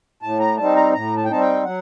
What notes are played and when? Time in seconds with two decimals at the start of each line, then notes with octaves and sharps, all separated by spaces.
0.22 A2 A5
0.40 A#5
0.57 G3 C4 D#4 A5
0.76 A#5
0.93 A2 A#5
1.17 A5
1.25 G5
1.28 G3 C4 D#4 A5
1.40 G5
1.64 F#3 F#5